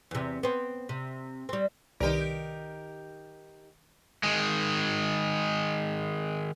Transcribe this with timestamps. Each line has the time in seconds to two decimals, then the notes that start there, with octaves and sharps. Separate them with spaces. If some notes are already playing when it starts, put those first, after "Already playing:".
0.11 E2 C3
0.43 B3 C4
0.89 C3
1.49 G3 C4
2.00 C2 D#3 D#4 G4 A#4 D5
4.23 D#3 G#3